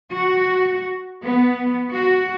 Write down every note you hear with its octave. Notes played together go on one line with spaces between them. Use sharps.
F#4
B3
F#4